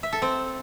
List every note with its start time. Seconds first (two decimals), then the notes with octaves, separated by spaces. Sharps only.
0.03 E5
0.13 A4
0.22 C4